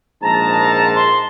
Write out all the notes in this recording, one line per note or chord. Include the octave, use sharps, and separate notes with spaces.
A#1 G#2 A5 A#5
C6